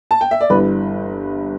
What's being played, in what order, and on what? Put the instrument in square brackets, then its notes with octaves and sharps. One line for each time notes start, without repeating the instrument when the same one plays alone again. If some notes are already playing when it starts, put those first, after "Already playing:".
[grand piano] A5
G5
E5
D5
G1 G2 E3 B4